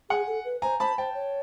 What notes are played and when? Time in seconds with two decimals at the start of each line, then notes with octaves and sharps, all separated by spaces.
0.10 G#4 F#5 G#5
0.27 A4
0.45 B4
0.62 C5 G#5 A#5
0.80 C5 A5 B5
0.98 C5 G5 A5
1.15 C#5